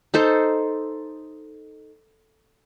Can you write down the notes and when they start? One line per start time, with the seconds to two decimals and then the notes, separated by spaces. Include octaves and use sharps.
0.14 D#4 A4 C5